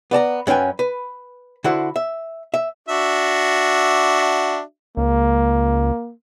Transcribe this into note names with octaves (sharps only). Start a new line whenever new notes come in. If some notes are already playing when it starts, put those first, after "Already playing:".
B3 D5 A5 A#5
F#2 C#4 B4 G5 G#5
B4
D3 E4 F#4 C5
E5
E5
D4 F#4 E5
C#2 A#3